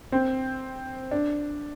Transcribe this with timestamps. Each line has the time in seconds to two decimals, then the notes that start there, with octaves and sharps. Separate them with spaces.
0.12 C4
1.11 D4